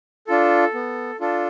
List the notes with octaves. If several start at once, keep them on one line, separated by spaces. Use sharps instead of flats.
D4 F4 A4
B3
D4 F4 A4